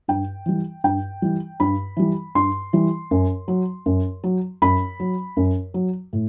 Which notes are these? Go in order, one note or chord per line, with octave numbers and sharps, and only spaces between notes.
G2 G5
E3 G3
G2 G5
E3 G3
G2 B5
E3 G3
G2 C6
E3 G3
F#2
F#3
F#2
F#3
F#2 B5
F#3
F#2
F#3
A2